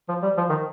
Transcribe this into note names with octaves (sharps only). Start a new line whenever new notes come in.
F3
G3
F3
D#3